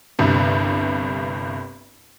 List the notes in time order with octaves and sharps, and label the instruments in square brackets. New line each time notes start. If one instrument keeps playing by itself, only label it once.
[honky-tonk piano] G1 C2 G2